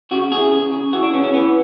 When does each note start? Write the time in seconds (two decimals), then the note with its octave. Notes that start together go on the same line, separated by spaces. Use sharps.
0.11 C#3 F#4
0.31 E2 G#4
0.52 C#3
0.72 C#3
0.93 E3 F#4
1.03 D4
1.13 C#3 C#4
1.24 C#4
1.34 E3 B3